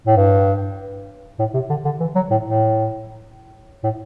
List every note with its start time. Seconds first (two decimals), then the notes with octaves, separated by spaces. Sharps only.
0.07 A2
0.17 G2
1.39 A2
1.54 C3
1.70 D3
1.85 D3
2.00 E3
2.16 F#3
2.31 A2
2.46 A2
3.84 A2